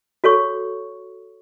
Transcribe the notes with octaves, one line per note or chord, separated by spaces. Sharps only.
F#4 A4 C#5 C#6